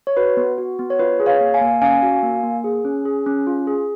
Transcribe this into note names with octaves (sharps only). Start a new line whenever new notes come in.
C#5
F#4 B4
B3
F#4
B3
C#5
F4 B4
G#4
C#5 F5
A#3
F5 G#5
A#3
C#4 F5 G#5
F#4
A#3
A#3
G#4
C#4
G#4
C#4
F4
G#4